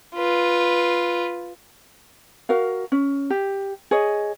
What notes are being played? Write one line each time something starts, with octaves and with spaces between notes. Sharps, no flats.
F4 B4
F#4 A#4 F5
C#4
G4
G#4 C#5 D#5